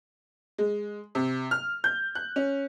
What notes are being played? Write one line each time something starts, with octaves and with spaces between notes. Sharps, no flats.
G#3
C3
F6
G6
F#6
C#4